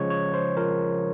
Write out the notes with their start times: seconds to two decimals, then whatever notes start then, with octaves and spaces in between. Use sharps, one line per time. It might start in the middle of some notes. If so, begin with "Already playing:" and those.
Already playing: C#3 F3 G#3 C#5
0.10 C#5
0.34 C5
0.57 F3 A#4